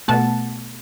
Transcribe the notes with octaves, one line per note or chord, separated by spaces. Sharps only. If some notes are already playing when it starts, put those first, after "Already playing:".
B2 A3 F#5 A5